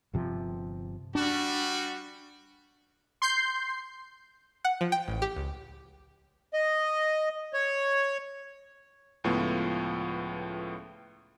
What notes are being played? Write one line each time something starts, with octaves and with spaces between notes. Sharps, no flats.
G1 C3 F3
G3 D4 F#4
C6 G6 C7
F#5
F3
G5
A1
G4
C#2
D#5
C#5
C#2 A2 F3 B3